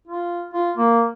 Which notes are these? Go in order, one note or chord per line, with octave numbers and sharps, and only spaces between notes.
F4
F4
A#3